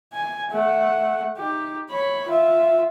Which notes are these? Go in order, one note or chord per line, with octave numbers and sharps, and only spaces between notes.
G#5
A3 F#5
D#4 G4
C#5 B5
F4 E5